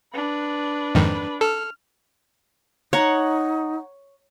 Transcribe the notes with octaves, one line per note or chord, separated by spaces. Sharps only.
D4 B4
F2 G#2 D#3
A4 F6
D#4 C#5 F#5 A#5